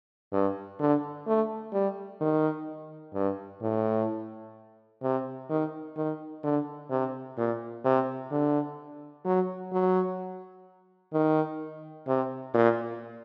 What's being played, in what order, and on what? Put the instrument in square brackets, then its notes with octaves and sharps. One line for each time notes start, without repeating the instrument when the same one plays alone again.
[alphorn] G2
D3
A3
G3
D#3
G2
A2
C3
D#3
D#3
D3
C3
A#2
C3
D3
F#3
F#3
D#3
C3
A#2